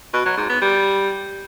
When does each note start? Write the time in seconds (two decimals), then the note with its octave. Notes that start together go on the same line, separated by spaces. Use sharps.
0.14 B2
0.26 F#3
0.37 G#2
0.49 B3
0.61 G3